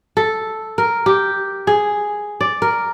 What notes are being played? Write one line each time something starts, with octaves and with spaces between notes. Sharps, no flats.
A4
A#4
G4
G#4
D5
A#4